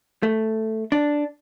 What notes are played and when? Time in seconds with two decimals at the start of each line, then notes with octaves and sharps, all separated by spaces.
0.23 A3
0.92 D4